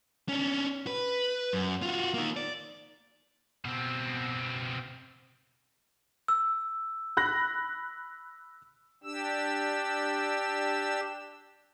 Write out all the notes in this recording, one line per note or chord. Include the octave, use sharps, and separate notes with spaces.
C#4 D4
B4
F#2
F4 F#4
A#3 D#4
D5
B2 C4
E6
B5 F#6 A#6
D4 G4 E6